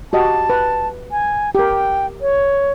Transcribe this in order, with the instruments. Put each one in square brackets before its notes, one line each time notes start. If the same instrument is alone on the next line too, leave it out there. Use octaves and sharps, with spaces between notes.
[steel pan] F#4 G4 D#5 [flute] A5
[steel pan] B4
[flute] G#5
[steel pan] G4 A#4 [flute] G5
[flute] C#5